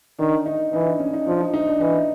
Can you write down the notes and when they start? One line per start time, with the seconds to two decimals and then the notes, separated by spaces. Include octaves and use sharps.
0.19 D#3 D4
0.46 D#4
0.73 E3 D#4
0.87 D4
0.99 C#4
1.13 D#4
1.27 F3 D4
1.40 D#4
1.54 D#4
1.67 D4
1.81 E3 D#4